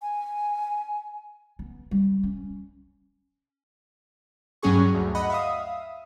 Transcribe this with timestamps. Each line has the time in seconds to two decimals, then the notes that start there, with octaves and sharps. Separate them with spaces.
0.02 G#5
1.59 B3
1.91 G3
2.23 C#4
4.62 G2 F#3 C#4 F#4 G#4 C#6
4.94 D2
5.15 D#5 F#5 B5
5.30 E5 F5 D#6